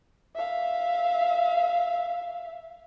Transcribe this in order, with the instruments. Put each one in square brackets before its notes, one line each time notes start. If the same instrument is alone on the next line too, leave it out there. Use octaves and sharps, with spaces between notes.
[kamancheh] E5 F5